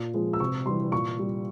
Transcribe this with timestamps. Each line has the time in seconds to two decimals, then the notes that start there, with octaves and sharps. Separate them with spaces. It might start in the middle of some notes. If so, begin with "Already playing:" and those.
Already playing: A#2
0.14 F3 G#3
0.33 E6
0.40 C3 C#6
0.66 E3 G3 C6
0.92 A#2 C#6
1.19 G3